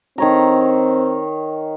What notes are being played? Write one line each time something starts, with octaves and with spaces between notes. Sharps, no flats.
D#3 C4 C#5 A#5